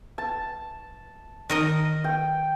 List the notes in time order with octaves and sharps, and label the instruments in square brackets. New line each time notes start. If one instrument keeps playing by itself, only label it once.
[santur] A5
[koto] D#3 A#4 D#5
[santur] G5